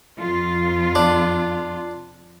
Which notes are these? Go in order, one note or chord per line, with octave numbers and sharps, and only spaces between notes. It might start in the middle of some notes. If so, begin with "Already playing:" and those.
F2 F4
D4